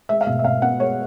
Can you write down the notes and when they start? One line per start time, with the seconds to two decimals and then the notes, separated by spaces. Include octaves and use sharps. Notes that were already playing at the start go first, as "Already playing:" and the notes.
0.09 G#3 E5
0.21 F5
0.27 B2 E5
0.39 E5
0.44 B2 F5
0.62 B3 F#5
0.80 G#3 C#5